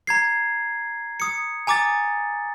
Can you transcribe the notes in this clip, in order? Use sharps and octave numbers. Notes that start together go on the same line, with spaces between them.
A#5 G#6 C7
D#6 C#7
G#5 A#5 D6 D#6 A6